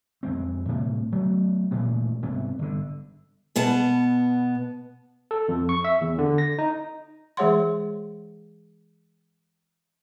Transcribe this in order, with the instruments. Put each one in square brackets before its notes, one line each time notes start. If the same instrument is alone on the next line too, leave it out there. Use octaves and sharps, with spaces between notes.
[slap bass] F2 G#3 C4
D2 A2 C3 G3
F#3 A3 B3
A1 G2 A#2 G#3
C2 G#2 C3 B3
G1 D3
[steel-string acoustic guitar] B2 B3 F#5 A5
[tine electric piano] A4
F2
C#6
E5
E2
D3
A#6
D#4
[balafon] E3 G#3 G#4 C#5 F#5 C6